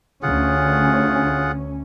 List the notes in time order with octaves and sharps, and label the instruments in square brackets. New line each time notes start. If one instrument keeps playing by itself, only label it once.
[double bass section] D2 C#4 [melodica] F4 G#4 F#5